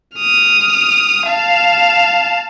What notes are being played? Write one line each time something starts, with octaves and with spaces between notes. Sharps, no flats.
D#6 F6
F5 A5